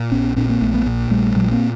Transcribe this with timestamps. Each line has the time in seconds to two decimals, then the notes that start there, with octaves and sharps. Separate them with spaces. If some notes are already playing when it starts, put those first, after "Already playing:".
Already playing: A#2
0.12 A#1 B3 C#4
0.36 A#2 C4 D4
0.49 A#3 C4
0.62 A#1 A3 B3
0.74 A3 B3
0.86 A#2
1.10 A#1 G3 A3
1.35 A#2 F#3 G#3
1.51 A#3 C4